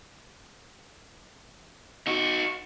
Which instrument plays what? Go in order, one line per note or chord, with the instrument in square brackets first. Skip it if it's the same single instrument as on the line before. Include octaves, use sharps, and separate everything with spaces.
[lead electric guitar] D#4 F#4